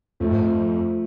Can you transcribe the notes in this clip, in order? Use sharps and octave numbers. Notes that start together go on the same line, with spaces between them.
F2 F3 A3
G#2
F2